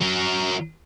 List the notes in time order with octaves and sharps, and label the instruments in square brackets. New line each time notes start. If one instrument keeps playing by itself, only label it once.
[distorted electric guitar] F#3 A#4